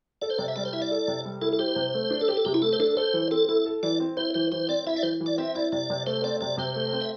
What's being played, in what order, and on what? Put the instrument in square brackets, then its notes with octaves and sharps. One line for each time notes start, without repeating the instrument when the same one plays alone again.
[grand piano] A4 [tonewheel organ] D5
[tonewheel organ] C5
[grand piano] C3 [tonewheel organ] D5
[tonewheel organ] E5
[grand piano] G3 [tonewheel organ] D5
[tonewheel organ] C5
[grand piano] E4 [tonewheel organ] E5
[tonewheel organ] D5
[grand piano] A4
C3
G3
[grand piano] E4 [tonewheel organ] A4
[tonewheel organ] A4
[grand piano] G4 [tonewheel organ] C5
[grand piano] C3
A3
D4
[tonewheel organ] A4
[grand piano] G4 [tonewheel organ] C5
[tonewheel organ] A4
[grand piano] C3 [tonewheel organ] G4
[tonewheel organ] E4
[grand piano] A3 [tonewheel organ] A4
[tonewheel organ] C5
[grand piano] D4 [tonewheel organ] A4
[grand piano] A4 [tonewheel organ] C5
[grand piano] E3
[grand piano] C4 [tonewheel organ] A4
[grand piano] E4 [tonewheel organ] A4
[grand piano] A4
[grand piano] E3 [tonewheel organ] D5
[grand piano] C4
[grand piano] E4 [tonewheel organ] C5
[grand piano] E3 [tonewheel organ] C5
[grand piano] E3 [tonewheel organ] C5
[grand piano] C4 [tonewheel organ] D5
[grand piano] E4 [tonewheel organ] E5
[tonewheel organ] D5
[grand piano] E3 [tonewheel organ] C5
[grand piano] E3
[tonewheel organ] D5
[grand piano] C4 [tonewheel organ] E5
[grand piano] E4 [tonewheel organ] D5
[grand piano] C3 [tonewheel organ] D5
[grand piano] C3
[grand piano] A3 [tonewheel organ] C5
[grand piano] C4 [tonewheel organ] D5
[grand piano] C3 [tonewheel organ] D5
[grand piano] C3 [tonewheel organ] C5
[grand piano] A3
C4
[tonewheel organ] E5